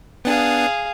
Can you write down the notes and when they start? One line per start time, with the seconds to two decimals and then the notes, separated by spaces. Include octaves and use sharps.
0.25 B3 D4 G#4 F5